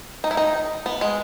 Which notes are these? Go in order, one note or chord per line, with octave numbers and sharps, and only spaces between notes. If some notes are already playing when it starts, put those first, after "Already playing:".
D#4
E4
D#4
B3
G#3